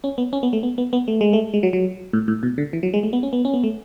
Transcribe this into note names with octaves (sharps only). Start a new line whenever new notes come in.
C#4
B3
C#4
B3
A3
B3
B3
B3
A3
G#3
A3
G#3
F#3
F#3
A2
A2
B2
D3
E3
F#3
G#3
A3
B3
C#4
B3
C#4
B3
A3